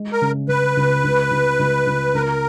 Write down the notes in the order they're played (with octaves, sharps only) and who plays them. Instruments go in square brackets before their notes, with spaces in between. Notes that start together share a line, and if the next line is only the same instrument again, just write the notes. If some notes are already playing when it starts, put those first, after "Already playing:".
Already playing: [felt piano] G#3
[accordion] A#4
[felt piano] C#3
[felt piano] C#3 [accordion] B4
[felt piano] C#2
C#2
C#2
C#2
C#2
[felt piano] C#2 [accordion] A#4